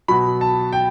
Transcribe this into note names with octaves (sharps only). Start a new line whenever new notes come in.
B2 F#3 B5
A5
G5